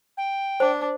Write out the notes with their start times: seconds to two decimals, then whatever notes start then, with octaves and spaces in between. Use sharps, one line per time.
0.17 G5
0.60 D4 C5